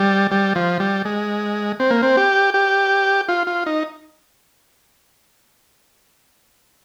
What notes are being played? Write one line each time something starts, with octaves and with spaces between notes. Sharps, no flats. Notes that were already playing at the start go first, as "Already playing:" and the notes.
Already playing: G3
G3
F3
G3
G#3
C4
A#3
C4
G4
G4
F4
F4
D#4